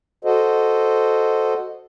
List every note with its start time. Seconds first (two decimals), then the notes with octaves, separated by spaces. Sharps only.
0.25 F#4 A4 C5 D#5